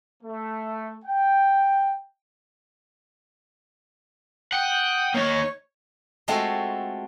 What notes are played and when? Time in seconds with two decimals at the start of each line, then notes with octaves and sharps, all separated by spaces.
0.23 A3
1.05 G5
4.52 F#5 G5 D#6
5.14 A#3 D#4 C#5
6.28 G#3 A3 C4 F4 F#4 A4